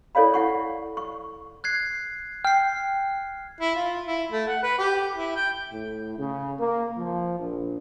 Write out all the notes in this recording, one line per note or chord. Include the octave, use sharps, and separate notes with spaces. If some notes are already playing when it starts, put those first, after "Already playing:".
E4 A4 C#5 D5 F5 B5
E4 F#5 C#6
C#6
F#6 G#6 C7
G5 F6 C7
E4
F4
E4
A3
F#5
B4
G4
E4
G5
A2
C#3
A#3
F3
A#1